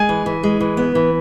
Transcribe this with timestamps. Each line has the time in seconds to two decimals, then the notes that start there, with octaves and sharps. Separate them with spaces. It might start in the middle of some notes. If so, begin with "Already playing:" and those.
Already playing: G#3 G#5
0.09 E3
0.26 E3
0.43 G#3
0.60 E3
0.77 B3
0.95 E3